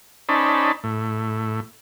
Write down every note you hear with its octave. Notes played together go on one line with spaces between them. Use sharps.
C#4 D#4 C5 D5 A5 B5
A2